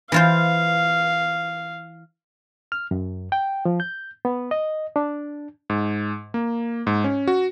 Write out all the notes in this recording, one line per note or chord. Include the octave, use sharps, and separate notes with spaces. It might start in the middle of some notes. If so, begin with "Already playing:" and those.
E3 F4 C5 F5
F6
F#2
G5
F3
G6
B3
D#5
D4
G#2
A#3
G#2
C#4
F#4